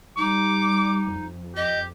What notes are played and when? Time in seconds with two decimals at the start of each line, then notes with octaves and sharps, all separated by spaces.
0.17 G3 D#4 D6
1.10 F2
1.56 G4 D#5